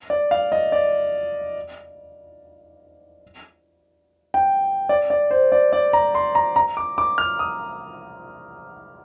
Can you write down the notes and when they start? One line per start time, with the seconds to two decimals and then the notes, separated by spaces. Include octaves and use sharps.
0.10 D5
0.31 F5
0.52 D#5
0.72 D5
4.34 G5
4.89 D5
5.10 D5
5.31 C5
5.52 D5
5.73 D5
5.93 A#5
6.15 C6
6.35 A#5
6.56 A#5
6.77 D6
6.98 D6
7.18 F6
7.39 D#6